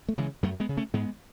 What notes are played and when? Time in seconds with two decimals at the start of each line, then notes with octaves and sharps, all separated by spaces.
0.09 A3
0.18 C#3 E3 G#3
0.43 F#2 F#3 A3
0.60 G#3 B3
0.69 C#3
0.77 A3 C#4
0.93 G#2 G#3 B3